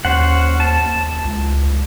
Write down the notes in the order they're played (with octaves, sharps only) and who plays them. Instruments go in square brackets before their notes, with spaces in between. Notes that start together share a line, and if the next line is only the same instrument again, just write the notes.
[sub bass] D#2 [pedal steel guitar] C#4 C5 F#5
[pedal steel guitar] A5
[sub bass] C#2